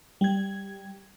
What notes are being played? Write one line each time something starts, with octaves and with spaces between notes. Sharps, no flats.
G3 G#6